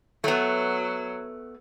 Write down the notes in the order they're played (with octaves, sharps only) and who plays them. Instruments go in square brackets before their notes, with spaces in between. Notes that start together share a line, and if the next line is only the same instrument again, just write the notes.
[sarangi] F#3 [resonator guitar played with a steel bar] A3 B3